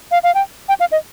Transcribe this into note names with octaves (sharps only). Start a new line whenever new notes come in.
F5
F5
G5
G5
F5
D#5